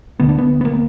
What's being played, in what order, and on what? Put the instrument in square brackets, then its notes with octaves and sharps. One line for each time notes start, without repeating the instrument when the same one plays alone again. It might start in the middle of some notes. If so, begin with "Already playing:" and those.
[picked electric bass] D2 D3 B3
D4
B3
B3
A#3